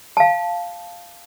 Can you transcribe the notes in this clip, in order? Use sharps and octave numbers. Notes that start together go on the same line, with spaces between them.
F5 A5